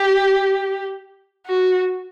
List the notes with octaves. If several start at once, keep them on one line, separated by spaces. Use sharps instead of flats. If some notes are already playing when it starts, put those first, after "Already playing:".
Already playing: G4
F#4